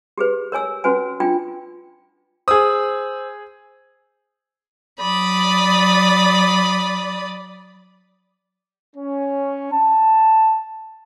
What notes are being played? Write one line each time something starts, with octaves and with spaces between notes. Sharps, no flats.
G4 G#4 B4
A#4 C#5 G#5 E6
C#4 F#4 B4 G#5
D4 F4 G5
G#4 C5 D#6 E6
F#3 D5 B5 D#6
C#4
A5